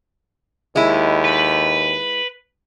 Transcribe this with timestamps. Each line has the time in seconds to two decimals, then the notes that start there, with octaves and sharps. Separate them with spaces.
0.76 D#2 G#3 E4
1.24 B4